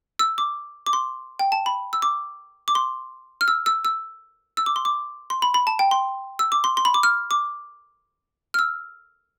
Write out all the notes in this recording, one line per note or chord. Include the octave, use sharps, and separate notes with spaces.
E6
D6
D6
C6
G5
A5
B5
E6
D6
D6
C6
F6
E6
E6
E6
E6
D6
C6
D6
C6
B5
B5
A5
G5
C6
E6
D6
C6
C6
B5
D6
F6
D6
F6
E6